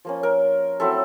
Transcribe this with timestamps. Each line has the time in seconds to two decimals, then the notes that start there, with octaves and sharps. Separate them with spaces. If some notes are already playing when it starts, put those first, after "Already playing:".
0.05 F3 A#3 C#4
0.23 A#4
0.80 F#3 A3 C4 E4 A4